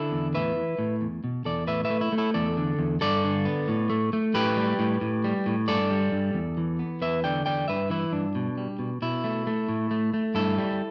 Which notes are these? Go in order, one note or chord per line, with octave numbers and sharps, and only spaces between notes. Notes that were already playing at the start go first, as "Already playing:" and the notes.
Already playing: D3 E4 A4
E2
A2 B4 E5
E3
A2
E2
B2
E2 A4 D5
A2 B4 E5
B4 E5
A3
E4
A3
E4 A4
E2 A4 D5
D3
E2
G2 A4 D5
D3
B3
A2
A3
A3
A2 G4 B4
G3
A2
A2
G3
A2
G2 A4 D5
G3
G2
E2
E3
B3
E2 B4 E5
D3 D5 G5
E2 D5 G5
G2 B4 E5
E3 E4
G2 D4
B2
G3
B2
B2 E4
A3
A3
A2
A3
A3
G2 E4 A4
G3